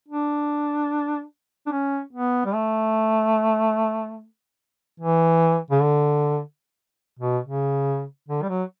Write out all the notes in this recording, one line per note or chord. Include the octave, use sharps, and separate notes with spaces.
D4
D4
C#4
B3
G3
A3
E3
C#3
D3
B2
C#3
D3
G3
F#3